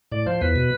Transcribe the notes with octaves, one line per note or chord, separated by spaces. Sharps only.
A2 D5
F3 C5
E2 B4
B2